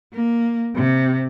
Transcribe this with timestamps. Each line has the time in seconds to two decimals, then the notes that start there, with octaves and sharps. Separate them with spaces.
0.13 A#3
0.75 C3